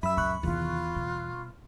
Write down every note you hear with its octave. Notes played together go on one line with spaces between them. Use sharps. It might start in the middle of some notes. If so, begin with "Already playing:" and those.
F#2 E5 B5 E6
C#2 A#2 B5 C#6 F#6
E2 C3 D#3 F4
B2 G3